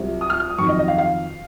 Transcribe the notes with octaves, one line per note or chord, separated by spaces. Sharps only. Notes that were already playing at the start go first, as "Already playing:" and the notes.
Already playing: C2 C3 F#3 C4 F4
D#6
F6
F6
D#6
F2 D#3 F#3 C#6
D#5
D#5
F5
F5